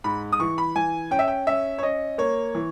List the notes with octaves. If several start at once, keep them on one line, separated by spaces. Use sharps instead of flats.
G#2 B5
D#6
E3 C#6
B5
E3 G#5
C#4 G5
E5
G5
C#4 E5
C#5
C#4 D#5
A#3 C#5
E3